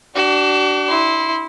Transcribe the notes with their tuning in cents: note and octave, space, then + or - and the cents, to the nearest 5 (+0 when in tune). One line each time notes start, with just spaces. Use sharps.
D4 +0 F#4 +45
E4 -20 C6 +0